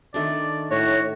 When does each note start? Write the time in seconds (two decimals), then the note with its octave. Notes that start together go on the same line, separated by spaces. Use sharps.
0.14 D#3 A3 D4 D5
0.71 A2 F#4 C#5